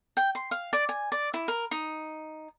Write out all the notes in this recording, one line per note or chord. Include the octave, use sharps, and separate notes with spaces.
G5
C6
F5
D5
G#5
D5
E4
A#4
D#4